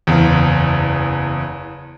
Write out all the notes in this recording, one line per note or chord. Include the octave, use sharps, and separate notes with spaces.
F#1 E2